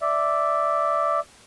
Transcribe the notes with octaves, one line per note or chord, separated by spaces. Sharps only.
D5 E5